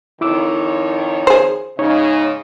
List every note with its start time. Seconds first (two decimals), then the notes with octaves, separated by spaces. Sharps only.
0.21 F2 D#3 E4 C#5 D6 E6
1.27 G#4 C5
1.79 G#2 C#3 D#4 C#5 D#5